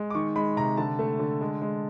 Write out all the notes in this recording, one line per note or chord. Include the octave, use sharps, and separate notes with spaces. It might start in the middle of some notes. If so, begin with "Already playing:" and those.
Already playing: G#3
D6
D#3 C#6
G#3 B5
C3 A#5
D3 A5
A3
D3
G#3
G#3